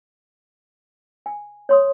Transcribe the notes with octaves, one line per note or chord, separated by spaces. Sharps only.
G#5
C#5 C6 D#6